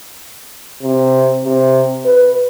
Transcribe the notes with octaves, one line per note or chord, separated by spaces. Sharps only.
C3
C3
B4